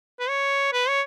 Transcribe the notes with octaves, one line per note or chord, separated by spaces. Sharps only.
B4
C#5
B4
C#5